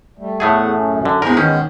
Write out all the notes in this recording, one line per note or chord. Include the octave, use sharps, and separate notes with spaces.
G3 A3
E2 A2 A3 G#4 F#5
F#2 C#4
D3
E2 G#2 G#4 A#4
D#3 G#3 B3 C#4